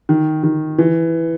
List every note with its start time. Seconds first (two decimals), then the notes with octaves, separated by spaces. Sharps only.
0.09 D#3
0.43 D#3
0.78 E3